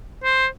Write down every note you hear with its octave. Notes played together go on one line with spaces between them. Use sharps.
C5